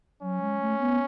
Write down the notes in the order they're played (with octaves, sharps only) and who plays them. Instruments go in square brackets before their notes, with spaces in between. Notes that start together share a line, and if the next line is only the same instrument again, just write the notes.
[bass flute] F#3 [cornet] C#4
[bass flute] G#3
A3
B3